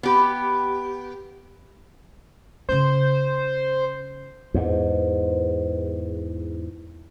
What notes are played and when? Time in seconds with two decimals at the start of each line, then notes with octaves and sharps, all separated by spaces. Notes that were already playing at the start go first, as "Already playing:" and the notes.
0.03 B3 G4
2.69 C#3 C#4 C5
4.54 E2 G#2